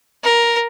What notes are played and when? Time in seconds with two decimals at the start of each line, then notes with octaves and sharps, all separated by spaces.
0.24 A#4